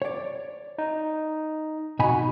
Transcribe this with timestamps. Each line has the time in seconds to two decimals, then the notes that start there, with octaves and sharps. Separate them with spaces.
0.02 C#5 D5
0.78 D#4
1.99 B2 D#4 F#4 G#5 B5